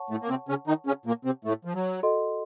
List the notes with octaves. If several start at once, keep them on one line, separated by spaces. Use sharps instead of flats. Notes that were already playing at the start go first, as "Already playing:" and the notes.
Already playing: C#5 F#5 A5 C#6
A2 A3
A#3
C3 C4
C#3 C#4
D#3 D#4
C#3 C#4
A#2 A#3
C3 C4
A2 A3
F3
F#3
F#4 A4 D#5 F#5 C6